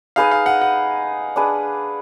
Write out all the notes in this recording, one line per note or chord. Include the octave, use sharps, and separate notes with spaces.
D#4 G#4 B4 D#5 F5
F5
F#5
F#5
D4 G#4 B4